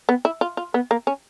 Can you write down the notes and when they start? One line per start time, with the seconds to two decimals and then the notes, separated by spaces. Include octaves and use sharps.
0.09 B3
0.25 E4
0.41 F4
0.57 F4
0.74 B3
0.91 A#3
1.07 C#4